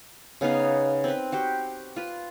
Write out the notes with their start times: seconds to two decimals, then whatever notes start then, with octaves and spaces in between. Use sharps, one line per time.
0.41 C#3 B3 D#4 F5
1.04 C4 B4
1.32 F#4 G4 C5
1.96 F4 B4